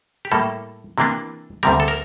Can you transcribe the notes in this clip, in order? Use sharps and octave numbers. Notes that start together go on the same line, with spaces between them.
G4
A2 G3 A#3 A4
C3 E3 A#3 D4
D2 C3 G3 A#4
A4
A#4